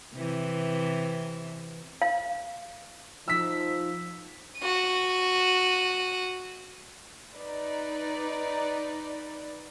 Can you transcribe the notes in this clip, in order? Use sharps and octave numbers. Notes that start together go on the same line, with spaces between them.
C3 E3
F5
F3 D#4 E6 B6
F#4 D#7
D#4 B4 D5